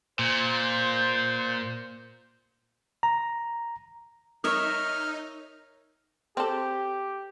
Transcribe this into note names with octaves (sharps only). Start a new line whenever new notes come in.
A#2 C5
A#5
D#4 A#4 C#5 E5 C#6 D#6 F6
C4 G4 A4